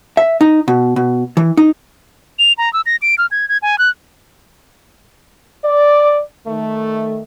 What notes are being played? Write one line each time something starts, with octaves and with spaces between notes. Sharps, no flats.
E5
D#4
B2
B2
E3
D#4
F7
A#5
E6
A#6
D7
F6
G#6
G#6
G#5
F#6
D5
D#3 A3